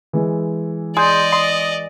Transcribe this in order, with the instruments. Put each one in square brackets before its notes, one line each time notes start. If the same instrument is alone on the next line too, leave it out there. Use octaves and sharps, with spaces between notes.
[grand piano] E3 G#3
[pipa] G#4 [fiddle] D5 D#5 [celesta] C6 G6
[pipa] C6 [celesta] D#6